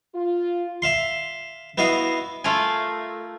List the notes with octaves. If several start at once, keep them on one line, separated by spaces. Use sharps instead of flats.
F4
E5 F5 C6
B3 E4 F#4 D#5 F5
A3 F4 A#4 F5 G#5